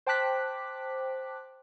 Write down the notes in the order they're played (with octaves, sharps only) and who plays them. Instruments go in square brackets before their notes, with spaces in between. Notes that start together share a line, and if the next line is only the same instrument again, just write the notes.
[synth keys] C5 G5 A5 D6 F#6 B6